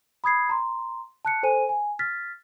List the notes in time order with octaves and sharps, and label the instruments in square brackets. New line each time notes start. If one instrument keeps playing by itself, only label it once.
[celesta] B5 D#6 G#6 C7
A#5 C6
A5 F#6 C#7
A4 C5 G#5 D#7
G#5
F6 A6 B6